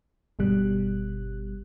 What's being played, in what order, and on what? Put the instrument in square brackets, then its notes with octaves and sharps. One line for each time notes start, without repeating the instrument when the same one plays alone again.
[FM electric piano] G1 B2 G3 F#6